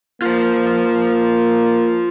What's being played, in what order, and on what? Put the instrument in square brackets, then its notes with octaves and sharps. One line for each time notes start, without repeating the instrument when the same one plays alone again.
[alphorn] A#3 [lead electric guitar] F4 C5